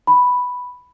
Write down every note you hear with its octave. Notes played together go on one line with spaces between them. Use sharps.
B5